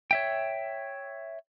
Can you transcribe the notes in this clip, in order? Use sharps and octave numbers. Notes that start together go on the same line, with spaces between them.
C#5 E5 G5